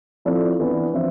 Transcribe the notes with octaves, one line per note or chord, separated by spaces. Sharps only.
F3 C4 E4 A4 D5
E3 B3 D4
F3 C4 F4 C5 E5